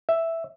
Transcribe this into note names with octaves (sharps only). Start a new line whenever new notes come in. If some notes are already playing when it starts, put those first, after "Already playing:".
E5